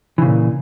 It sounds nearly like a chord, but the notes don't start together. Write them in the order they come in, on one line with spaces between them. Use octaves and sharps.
E3 C#3 A#2